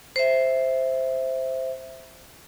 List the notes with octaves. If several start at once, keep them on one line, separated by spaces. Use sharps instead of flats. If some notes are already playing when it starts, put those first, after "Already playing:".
C5 E5